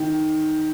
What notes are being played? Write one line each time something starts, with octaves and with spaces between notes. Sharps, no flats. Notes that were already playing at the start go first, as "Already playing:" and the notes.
Already playing: D#3